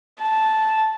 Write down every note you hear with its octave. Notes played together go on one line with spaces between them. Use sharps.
A5